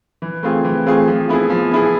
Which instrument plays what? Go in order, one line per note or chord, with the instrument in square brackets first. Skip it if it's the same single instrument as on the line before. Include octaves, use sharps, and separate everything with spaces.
[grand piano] E3
A3 C4 F4 G#4
E3
A3 C4 F4 G#4
F3
B3 E4 G#4
F3
B3 E4 G#4